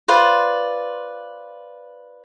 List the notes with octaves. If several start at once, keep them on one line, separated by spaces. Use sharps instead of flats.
F4 B4 C5 D5